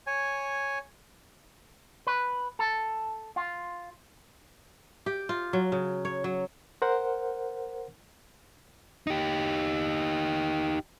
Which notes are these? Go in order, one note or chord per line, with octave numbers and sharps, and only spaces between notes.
C#5 G#5
B4
A4
F4
G4
F4
F#3
C#3
C#5
F#3
A#4 C5 F#5
D#4 G4